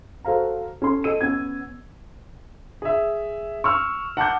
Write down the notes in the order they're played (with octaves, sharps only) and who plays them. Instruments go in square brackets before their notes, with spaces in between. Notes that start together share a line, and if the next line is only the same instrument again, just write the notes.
[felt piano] F#4 A4 C5 F5 A#5
C#4 A4 C6
A4 D#5 E6 D#7
B3 C#4 G#6
[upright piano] G#4 E5
C#6 E6 F6
F#5 A5 D6 G6